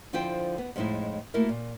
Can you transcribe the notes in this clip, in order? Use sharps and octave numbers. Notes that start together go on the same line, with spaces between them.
D3 F3 E4 F4 C5 G5
B3
F2 A2 G#3 D#4 E4
A3 A#3 E4 F#4 A#4
A#2